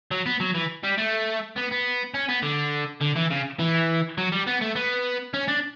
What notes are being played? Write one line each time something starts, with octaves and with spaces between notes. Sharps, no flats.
F#3
B3
F#3
E3
G3
A3
B3
B3
C#4
B3
D3
D3
E3
C#3
E3
F#3
G3
B3
A3
B3
C#4
D4